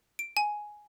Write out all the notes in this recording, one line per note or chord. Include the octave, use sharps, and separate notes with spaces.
D7
G#5